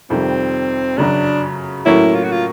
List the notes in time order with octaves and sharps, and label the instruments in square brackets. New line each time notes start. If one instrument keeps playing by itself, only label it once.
[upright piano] F2 C3 D#3 G3 [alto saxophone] C4
[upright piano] F#2 C#3 F#3 [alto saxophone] D4
[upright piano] A2 F#3 A#3 C#4 [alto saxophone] E4
[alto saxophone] F4
F#4
F4